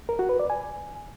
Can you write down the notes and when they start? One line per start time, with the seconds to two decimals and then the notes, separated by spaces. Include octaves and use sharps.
0.09 A#4
0.19 F#4
0.29 B4
0.39 D5
0.50 G#5